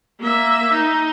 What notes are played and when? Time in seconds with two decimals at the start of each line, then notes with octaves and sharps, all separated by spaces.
0.20 A#3 E5
0.72 D#4